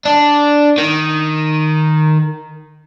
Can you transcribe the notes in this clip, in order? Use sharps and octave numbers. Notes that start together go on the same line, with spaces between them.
D4
D#3